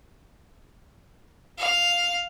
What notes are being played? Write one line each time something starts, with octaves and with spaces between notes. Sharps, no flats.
F5